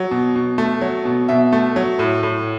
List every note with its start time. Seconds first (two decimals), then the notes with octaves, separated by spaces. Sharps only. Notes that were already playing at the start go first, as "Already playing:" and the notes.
Already playing: F#3
0.11 B2
0.36 B2
0.58 A3
0.81 F#3
1.05 B2
1.28 B2 E5
1.53 A3
1.76 F#3
1.99 A2
2.23 A2